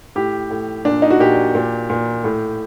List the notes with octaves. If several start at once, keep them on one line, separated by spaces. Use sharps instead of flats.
A2 G4
A2
A#2 D4
D#4
F#4
A#2 G4
A#2
A#2
A2